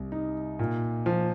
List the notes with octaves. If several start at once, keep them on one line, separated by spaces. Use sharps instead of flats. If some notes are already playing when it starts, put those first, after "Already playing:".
Already playing: C2
D#4
A#2
F3